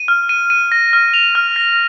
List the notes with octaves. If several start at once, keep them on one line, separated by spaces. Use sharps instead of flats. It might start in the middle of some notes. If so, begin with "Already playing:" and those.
Already playing: D#7
F6
D#7
D#7
A#6
F6
F7
F6
A#6